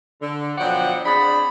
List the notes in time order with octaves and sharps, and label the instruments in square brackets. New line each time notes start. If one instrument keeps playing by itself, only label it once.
[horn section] D3
B2 F3 F#3 D5 F#5 G5
C4 D4 G#4 B5